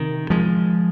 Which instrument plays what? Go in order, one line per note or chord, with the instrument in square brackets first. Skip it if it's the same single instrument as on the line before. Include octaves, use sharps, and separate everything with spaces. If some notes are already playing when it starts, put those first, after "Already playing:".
Already playing: [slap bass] C3 D#3
F3 G#3